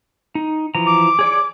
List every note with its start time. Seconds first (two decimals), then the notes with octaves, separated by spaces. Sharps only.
0.35 D#4
0.75 E3 F3 A#5
0.86 D6
1.19 G#4 C#5 D5